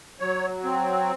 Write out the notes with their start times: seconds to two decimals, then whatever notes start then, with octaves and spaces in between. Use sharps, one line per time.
0.20 F#3 C#5
0.64 C4